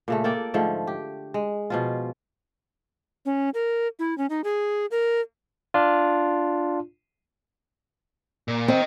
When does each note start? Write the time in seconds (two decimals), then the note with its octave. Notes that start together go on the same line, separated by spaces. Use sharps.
0.08 A#2 C#3 A3
0.24 A#3 A4 D5 G5
0.54 G#2 D3 F3 A3
0.87 G4
1.34 G#3
1.70 B2 F3 F4
3.25 C#4
3.54 A#4
3.99 E4
4.18 C#4
4.30 D#4
4.44 G#4
4.91 A#4
5.74 D4 F4
8.48 A#2
8.68 C4 D#5 G5